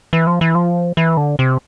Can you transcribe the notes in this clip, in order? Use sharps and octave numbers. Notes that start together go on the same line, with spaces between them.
E3
F3
E3
F3
E3
D3
C3